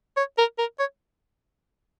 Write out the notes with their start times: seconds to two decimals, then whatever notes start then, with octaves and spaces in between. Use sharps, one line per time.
0.17 C#5
0.38 A#4
0.59 A#4
0.80 C#5